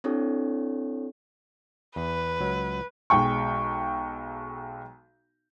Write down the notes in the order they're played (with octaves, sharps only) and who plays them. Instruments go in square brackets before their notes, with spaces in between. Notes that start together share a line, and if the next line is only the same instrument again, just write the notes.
[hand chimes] C4 D4 E4 G4 A4 C#5
[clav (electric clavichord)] E2 [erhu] B4
[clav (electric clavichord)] C#2 F#3
[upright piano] B1 G#3 G5 C#6